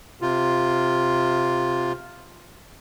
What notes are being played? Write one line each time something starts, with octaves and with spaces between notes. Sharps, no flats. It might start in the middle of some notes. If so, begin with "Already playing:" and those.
C3 F4